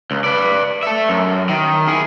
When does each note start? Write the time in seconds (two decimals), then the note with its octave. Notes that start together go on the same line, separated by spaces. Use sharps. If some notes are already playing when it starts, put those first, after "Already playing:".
0.11 C#2
0.24 B4 D5
0.83 A4 E5
1.09 F#2
1.49 D#3
1.88 E4 G#4